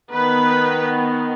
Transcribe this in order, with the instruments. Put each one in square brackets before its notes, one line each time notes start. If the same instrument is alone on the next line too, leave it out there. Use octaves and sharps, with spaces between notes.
[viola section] D#3 B3 B4